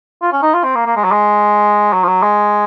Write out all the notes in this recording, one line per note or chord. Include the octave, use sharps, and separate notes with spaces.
F4
C#4
D#4
F4
C4
A#3
A#3
G#3
F#3
G#3
F#3
F3
F#3
G#3